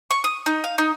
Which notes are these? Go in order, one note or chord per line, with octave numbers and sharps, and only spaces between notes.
C#6
D#6
D#4
F5
D#4